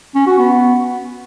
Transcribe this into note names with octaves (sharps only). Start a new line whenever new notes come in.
C#4
F#4
B3